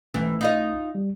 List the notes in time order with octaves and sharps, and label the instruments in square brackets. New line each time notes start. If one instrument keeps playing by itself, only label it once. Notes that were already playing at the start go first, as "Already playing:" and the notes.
[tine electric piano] B1 A3 C#4 [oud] G#2 E3
[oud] D#4 F4 D#5
[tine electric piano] G3